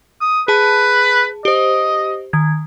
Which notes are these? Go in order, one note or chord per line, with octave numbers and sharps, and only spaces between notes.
D#6
G#4 B4 A5
G4 C5 D#5
D#3 G#6